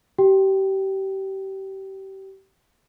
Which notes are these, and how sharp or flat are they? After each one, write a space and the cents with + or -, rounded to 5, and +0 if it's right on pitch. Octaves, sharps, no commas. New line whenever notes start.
G4 -30 G5 +0